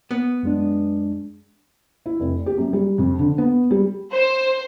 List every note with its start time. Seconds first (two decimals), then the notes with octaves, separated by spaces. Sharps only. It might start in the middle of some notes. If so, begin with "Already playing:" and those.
0.11 B3
0.43 F#2 G#3 D4
2.06 E4
2.20 F1
2.46 G4
2.58 F#2
2.73 G3
2.98 F2
3.19 D3
3.38 B3
3.71 G3
4.12 C5